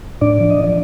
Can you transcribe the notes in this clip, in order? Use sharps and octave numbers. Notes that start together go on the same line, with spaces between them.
A2 D4 D5
F3
D#5
F3
D5